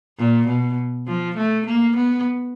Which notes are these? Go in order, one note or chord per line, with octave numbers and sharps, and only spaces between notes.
A#2
B2
F3
A3
A#3
B3